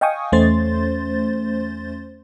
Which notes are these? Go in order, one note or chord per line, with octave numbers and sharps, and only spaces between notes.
D#5 F5 G5 G#5 C#6 D#6
E2 A3 C#4 C5 C6 A6